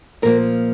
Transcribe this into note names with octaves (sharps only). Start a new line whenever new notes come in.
A#2 F3 A#3 A#4